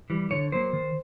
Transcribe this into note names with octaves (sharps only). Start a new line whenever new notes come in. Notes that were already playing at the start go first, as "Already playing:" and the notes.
E3 G3
D3 C#5
F#3 A#3 C5
D#3